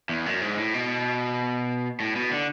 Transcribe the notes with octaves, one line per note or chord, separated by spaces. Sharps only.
E2
F#2
G#2
A2
B2
A2
B2
D3